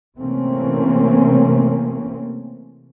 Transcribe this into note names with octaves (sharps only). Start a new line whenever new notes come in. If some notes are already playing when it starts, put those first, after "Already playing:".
C3 E3 A3 A#3 C4 C#4